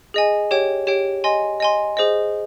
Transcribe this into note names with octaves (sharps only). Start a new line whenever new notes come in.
G#4 D#5 G#5
G4 C#5 G5
G4 C#5 G5
D#5 G#5 C6
D#5 G#5 C6
G#4 C5 D#5